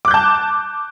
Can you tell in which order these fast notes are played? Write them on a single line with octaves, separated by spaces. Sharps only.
D6 F#6 G6 A5